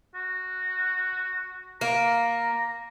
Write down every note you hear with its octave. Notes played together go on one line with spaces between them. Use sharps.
F#4
A#3 A#5